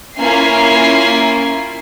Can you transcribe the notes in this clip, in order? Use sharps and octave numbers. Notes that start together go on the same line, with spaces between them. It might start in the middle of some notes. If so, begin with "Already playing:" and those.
A#3 C#4 E4 F4 G#5 C7